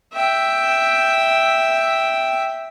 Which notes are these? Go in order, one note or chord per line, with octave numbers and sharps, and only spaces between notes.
E5 G5